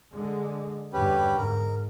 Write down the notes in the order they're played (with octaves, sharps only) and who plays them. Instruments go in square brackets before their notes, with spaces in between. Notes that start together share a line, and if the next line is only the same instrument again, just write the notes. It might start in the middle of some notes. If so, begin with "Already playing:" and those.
[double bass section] D3 G#3
[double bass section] E2 G2 D3 [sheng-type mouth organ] C#4 G4 B4
[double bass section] G#2 [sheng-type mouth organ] A#4